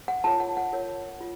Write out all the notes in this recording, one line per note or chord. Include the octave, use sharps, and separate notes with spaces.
F#5
F4 A#4 C#5 A5
F#5
F#5
F4 A#4 C#5
F4